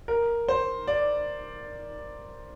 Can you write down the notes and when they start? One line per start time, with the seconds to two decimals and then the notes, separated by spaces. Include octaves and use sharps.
0.08 A#4
0.48 C5
0.87 D5